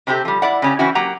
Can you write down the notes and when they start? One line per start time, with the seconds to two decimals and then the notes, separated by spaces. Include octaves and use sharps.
0.07 C3 C4 E4 G4 A4
0.25 F3 G3
0.42 E4 D5 F#5
0.62 C#3 C#4 G4
0.79 E3 C4 C#4 E4 F#4
0.95 F#3 A#3 G4 F#5 A#5